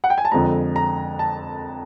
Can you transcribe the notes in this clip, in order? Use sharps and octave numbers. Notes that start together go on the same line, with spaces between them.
F#5
G5
G#5
A5
F2 D3 F3 G#3 A#5
A#5
A5